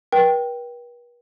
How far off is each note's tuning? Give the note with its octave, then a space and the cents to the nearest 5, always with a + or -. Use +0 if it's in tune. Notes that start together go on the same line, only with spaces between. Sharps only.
B4 -45 G5 +0